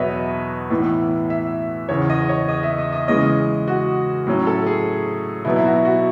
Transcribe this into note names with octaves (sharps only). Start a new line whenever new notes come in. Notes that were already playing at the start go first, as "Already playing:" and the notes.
Already playing: E2 B2 F#3 B3 B4 C#5 D#5 E5
A2 E3 B3
E5
E2 C#3 E3 C#5
D#5
C#5
D#5
E5
D#5
D#5
C#3 E3 G#3 C#4 D#5
F#4
A2 F#3 C#4
A4
G#4
B2 F#3 B3 E4
E4
F#4
F#4